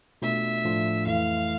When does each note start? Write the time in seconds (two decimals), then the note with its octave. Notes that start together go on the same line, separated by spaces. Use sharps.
0.22 B2 A3 D4 F4 E5
0.64 A2 F3 A3 D4 F4
1.07 F2 E3 A3 E4 F5